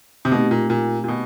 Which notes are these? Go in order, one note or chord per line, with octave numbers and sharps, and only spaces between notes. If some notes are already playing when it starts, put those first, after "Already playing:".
C3
B2 A3 C4 D#4 G4
A#2
A#2
A#2
B2